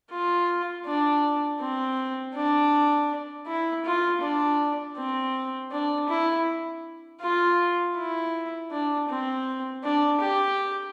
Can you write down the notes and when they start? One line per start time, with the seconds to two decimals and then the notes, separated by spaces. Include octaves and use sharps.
0.11 F4
0.85 D4
1.60 C4
2.34 D4
3.47 E4
3.85 F4
4.22 D4
4.97 C4
5.72 D4
6.08 E4
7.21 F4
7.96 E4
8.71 D4
9.09 C4
9.83 D4
10.21 G4